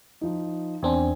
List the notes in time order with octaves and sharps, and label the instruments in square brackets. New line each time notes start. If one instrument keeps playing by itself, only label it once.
[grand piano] F3 D#4
[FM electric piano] E2 C4 D4 [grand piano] G#5